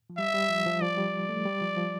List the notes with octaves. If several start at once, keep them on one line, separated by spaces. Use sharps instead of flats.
F3
G3 E5
G3
F3
F3
F3 D5
G3
A3
G3
F3
F3